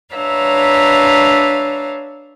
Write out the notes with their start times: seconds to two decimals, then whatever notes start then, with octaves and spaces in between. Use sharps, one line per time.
0.14 D4 B4 C#5 E5 F5 A#5